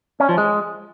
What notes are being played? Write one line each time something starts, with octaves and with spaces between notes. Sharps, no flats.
C#4
F3
G#3